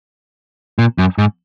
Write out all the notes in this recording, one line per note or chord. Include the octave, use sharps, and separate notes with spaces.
A#2
F#2
G#2